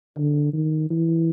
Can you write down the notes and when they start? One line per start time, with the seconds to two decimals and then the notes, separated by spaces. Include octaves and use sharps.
0.17 D3
0.53 D#3
0.90 E3